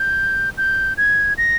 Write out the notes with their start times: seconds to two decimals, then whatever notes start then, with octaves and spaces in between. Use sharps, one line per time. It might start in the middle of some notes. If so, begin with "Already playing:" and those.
Already playing: G6
0.58 G6
0.97 G#6
1.38 A#6